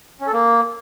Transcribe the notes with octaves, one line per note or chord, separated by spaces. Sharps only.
C#4
A4
A#3